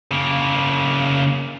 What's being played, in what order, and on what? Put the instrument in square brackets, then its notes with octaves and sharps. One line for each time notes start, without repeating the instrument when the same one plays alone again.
[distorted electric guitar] C#3 A#3